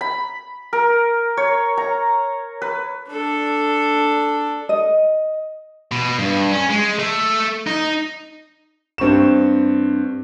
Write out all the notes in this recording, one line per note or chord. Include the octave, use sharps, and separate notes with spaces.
B5
A#4
C#5
A#5
B4
D4 A4
D#5
B2
G2
C#4
G#3
A3
D#4
G2 C4 C#6 E7